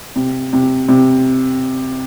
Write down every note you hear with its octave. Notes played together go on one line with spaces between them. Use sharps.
C3
C3
C3